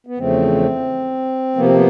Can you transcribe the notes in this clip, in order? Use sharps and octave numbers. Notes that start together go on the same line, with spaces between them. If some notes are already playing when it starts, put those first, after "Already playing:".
B3
E2 C#3 F3 A3 C4
C3 F3 A#3 B3
C4
B3